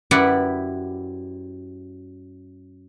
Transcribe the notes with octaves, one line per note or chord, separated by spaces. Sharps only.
F#2 E4 G4 B4 D5 F#5